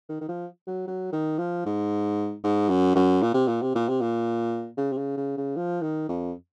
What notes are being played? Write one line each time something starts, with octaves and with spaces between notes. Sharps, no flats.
D#3
D#3
F3
F#3
F#3
D#3
F3
G#2
G#2
F#2
F#2
A#2
C3
A#2
C3
A#2
C3
A#2
C#3
C3
C#3
C#3
C#3
F3
D#3
F2